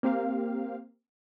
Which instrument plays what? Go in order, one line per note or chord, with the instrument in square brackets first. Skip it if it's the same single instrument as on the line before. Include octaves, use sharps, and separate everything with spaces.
[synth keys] A#3 C4 G4 F5